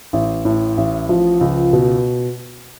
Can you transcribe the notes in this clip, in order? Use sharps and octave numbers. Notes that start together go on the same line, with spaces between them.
A1
A2
A1
F3
C#2
B2